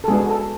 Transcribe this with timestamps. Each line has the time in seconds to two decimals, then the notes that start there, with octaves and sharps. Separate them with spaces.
0.04 A4
0.08 G#3 B3 D4 F#4 G#4
0.29 A4